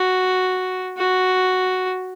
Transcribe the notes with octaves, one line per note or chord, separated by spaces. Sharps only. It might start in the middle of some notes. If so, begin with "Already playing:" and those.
Already playing: F#4
F#4